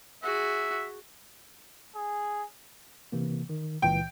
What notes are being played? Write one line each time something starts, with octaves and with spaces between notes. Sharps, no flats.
F#4 G#4 E5
G#4
C3 E3 A#3
D#3
C#2 A#2 E3 G5